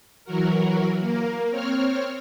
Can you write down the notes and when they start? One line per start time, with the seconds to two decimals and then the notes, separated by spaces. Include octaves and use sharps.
0.25 E3 F#3 F#4 A#4
1.00 A#3 A#4
1.50 C4 C#5 F6